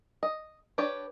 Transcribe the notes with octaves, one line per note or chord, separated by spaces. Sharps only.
D#5
D4 G4 B4 C#5 D5